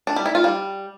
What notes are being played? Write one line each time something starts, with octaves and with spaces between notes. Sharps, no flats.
D4
G3
E4
F4
G3